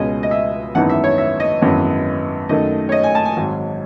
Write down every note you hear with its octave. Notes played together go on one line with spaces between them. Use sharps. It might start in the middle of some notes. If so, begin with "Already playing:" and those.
Already playing: C#2 B2 G#3 C#4 D#5
D#5
E5
G#1 F#2 E3 B3 D#4 F#5
E5
C#5
E5
D#5
G#1 F#2 E3 B3
F#2 D#3 A3 D#5
C#5
D#5
G#5
A5
G#5
G#1 G#2 F#3